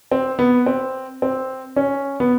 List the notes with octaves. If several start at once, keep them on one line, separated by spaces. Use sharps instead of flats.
C4
B3
C4
C4
C#4
B3